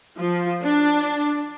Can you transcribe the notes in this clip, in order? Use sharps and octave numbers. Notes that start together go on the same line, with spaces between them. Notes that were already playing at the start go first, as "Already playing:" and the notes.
F3
D4